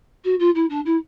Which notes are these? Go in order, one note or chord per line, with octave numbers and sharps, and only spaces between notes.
F#4
F4
E4
D4
E4